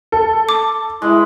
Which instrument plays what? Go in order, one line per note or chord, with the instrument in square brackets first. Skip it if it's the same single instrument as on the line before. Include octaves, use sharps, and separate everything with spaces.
[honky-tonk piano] A4
[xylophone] D6
[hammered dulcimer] G#3 B4 E5 [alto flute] E4